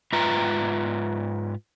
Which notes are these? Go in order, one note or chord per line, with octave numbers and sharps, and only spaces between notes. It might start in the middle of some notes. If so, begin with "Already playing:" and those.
G#2 F4 B4 E5 A#5